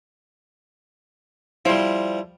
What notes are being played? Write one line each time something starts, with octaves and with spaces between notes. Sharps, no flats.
F3 G3 E4 C5